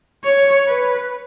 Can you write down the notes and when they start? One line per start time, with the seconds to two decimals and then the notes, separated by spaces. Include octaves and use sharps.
0.24 C#5
0.68 B4